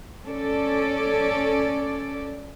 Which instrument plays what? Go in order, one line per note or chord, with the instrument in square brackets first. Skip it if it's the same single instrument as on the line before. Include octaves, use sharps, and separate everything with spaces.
[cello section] C#4 A4 D5